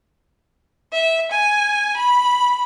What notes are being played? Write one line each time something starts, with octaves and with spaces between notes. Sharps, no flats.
E5
G#5
B5